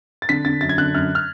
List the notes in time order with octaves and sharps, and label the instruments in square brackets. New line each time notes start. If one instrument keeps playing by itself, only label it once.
[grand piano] A6
D3 B6
D3 A6
F#2 A6
G#6
D3 F#6
F#2 F6
F6